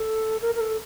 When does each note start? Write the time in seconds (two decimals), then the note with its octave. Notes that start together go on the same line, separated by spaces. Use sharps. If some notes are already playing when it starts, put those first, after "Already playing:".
Already playing: A4
0.42 A#4
0.55 A#4
0.61 A4